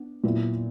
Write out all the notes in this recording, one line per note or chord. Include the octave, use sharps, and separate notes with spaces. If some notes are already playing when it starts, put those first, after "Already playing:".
Already playing: B3 D4
A#2 F#3 B3 E4